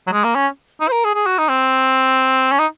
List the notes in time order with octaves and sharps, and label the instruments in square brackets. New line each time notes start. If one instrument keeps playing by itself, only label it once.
[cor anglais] F#3
G#3
A#3
C#4
D#4
C5
A#4
G#4
G#4
F#4
D#4
C4
C#4
D#4